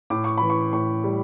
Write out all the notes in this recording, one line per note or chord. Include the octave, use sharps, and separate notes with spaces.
A2 D6
C#6
E3 B5
C#6
A2 C#6
G3